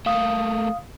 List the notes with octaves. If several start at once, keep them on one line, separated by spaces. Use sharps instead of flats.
A3 A#3 F5 D#6